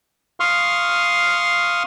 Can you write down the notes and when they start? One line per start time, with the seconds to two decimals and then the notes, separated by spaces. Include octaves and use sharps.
0.40 F5 C6 C#6 D#6 F6